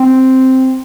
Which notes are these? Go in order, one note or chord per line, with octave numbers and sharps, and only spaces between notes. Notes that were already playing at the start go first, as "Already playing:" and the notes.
Already playing: C4